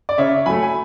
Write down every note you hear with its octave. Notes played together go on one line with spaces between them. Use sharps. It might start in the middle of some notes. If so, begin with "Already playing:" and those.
D5
C#3 C#5 E5
F#3 A3 G#5 B5
G#5